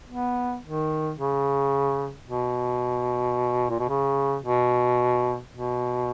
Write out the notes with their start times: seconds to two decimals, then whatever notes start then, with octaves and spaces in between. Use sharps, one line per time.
0.09 B3
0.63 D#3
1.17 C#3
2.26 B2
3.70 A#2
3.79 B2
3.89 C#3
4.43 B2
5.52 B2